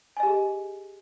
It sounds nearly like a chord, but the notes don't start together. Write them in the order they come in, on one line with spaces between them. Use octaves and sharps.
G#5 D#5 G4 G#4